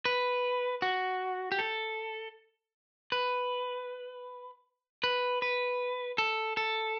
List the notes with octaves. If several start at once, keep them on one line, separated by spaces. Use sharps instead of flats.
B4
F#4
G4
A4
B4
B4
B4
A4
A4